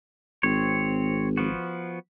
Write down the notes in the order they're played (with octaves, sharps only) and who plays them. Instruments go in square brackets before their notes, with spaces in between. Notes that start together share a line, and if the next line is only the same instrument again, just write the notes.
[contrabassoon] G#1 [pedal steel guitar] C4 C#5
[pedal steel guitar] F3 B3 F#4